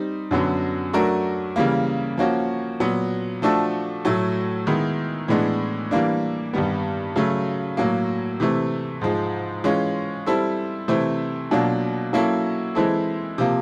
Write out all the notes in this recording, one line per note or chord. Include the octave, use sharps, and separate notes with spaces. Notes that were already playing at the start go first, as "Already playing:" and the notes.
Already playing: G3 C4 D#4
F#2 D3 F#3 B3
F#3 A3 D4 F#4 A#4
C#3 E3 G3 A#3
F3 A#3 C#4 F#4
A#2 F#3 B3
F3 A3 D4 F#4 A4
A2 F#3 A3
D#3 G#3 B3 E4
A2 E3 G#3 B3 D4
E3 G3 A#3 D4
G2 D#3 G3 B3
C#3 F#3 A3
A2 F#3 A#3
C3 E3 A3 C4
G#2 F3 G#3
E3 G#3 C#4 F4
G3 C4 E4 A4
C3 E3 A3 C4 E4
B2 F#3 A#3 D4 F4
F#3 A#3 C#4 E4 A4
E3 G#3 C4 E4 A4
C3 F3 A#3